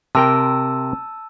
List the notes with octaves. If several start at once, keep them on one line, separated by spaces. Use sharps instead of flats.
C3 A#4 G5 A5 E6